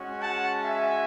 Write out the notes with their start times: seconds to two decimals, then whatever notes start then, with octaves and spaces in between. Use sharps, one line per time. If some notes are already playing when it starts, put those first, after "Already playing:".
Already playing: G#3 C#4 F#4
0.19 F#5 A5
0.64 E5 G#5